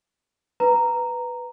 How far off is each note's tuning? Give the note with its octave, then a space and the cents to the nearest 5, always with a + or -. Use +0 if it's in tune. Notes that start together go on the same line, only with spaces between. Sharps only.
B4 +0 A#5 -5